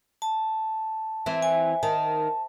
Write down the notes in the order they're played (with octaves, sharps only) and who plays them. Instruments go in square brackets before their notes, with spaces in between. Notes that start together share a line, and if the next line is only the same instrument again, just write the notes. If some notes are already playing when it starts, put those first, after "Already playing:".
[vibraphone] A5
[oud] E3 C4
[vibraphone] G#5
[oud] D#3 [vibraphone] A5